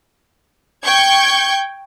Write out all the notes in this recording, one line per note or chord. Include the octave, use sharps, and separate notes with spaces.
G5 C#6 G6 G#6